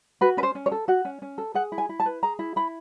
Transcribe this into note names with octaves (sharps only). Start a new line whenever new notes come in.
F#4 B4
C#4 B4
C5
C#4
C#5
A4
F#4 F#5
C#4
C#4
A4
G#4 F#5
E4
G#5
E4
A5
B4
G#4 A#5
E4
E4 B5